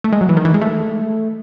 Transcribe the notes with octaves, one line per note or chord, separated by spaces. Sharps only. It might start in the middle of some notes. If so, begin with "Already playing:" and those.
A3
G#3
F#3
E3
D#3
E3
G#3
A3